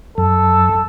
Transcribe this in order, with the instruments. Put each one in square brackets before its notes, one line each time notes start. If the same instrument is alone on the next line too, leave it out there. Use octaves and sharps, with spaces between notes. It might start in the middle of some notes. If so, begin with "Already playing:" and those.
[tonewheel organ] F#2 [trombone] A4